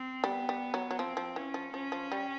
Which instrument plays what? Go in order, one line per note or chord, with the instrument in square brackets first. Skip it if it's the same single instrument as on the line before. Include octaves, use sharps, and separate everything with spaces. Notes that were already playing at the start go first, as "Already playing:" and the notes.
Already playing: [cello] C4
[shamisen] G3 [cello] B3
[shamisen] G3
F#3
F#3
[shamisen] F3 [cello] C4
[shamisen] F3
[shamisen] E3 [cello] C#4
[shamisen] F3
[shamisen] F3 [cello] C#4
[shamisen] F3
G3